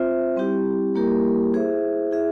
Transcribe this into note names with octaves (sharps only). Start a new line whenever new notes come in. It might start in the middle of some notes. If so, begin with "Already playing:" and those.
Already playing: C4 F4 C5 E5
G3 C4 E4 G4
G3 A#3 E4 G4 A#4
E4 G#4 C5 E5
E4 G#4 E5